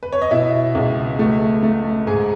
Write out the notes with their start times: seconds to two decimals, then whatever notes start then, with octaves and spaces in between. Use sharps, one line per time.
0.03 B4
0.12 C#5
0.22 D#5
0.31 B2 E4 E5
0.75 C#2
1.19 A3
1.63 A3
2.07 G#2 G#4 G#5